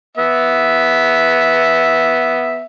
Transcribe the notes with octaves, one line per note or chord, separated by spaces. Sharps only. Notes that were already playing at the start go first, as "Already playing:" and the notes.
B3 E5